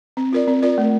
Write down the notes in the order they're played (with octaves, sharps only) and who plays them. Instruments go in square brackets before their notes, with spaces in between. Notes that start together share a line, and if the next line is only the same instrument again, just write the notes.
[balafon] C4
F4 A#4 D5
C4
F4 A#4 D5
A3